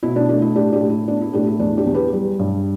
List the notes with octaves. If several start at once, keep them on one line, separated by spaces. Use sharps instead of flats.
B2 E4
D4
A3 D4
E4
A2 D4 G4
D4 G4
A2
E4
B3 D4
E4
A2 D4 G4
E4
E2 D4
D4 G4
E2
G4 B4
G3
G2